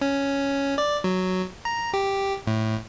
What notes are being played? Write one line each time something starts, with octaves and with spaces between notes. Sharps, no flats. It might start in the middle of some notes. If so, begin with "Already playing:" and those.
C#4
D5
F#3
A#5
G4
A2